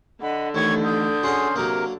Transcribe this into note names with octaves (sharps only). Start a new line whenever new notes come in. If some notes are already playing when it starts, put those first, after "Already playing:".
D3 D#5 F#5 B5
A1 D#3 C#5 C#6 G#6
D#6 G6
C#4 F#4 G#4 C6
C3 F#3 A#3 A#4